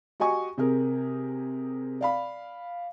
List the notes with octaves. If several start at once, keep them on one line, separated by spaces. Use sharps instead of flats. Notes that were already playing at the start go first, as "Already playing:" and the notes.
F#4 G4 D#5 G#5 C#6
C3 C4 G#4 A#4
D5 F5 B5